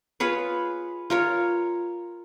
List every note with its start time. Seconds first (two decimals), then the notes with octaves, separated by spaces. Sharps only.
0.20 F4 G#4 B4 C#5
1.10 F4 A#4 C#5